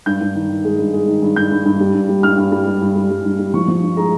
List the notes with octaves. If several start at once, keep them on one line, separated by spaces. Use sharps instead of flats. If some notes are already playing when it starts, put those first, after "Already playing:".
G2 G6
G2
D#3
D#3
G#3
G2
G#3
D#3
G2
G2 G6
G2
G2
G3
G2
G3
G2 F6
G2
G3
G2
G2
G3
G3
G2
G3
F3 C#6
F3
G2
G#3 A#5